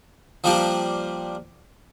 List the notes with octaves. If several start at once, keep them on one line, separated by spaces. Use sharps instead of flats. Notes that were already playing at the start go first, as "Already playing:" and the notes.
F3 G3 A#3 D4 F4 G4